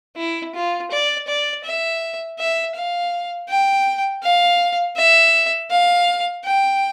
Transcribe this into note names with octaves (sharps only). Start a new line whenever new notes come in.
E4
F4
D5
D5
E5
E5
F5
G5
F5
E5
F5
G5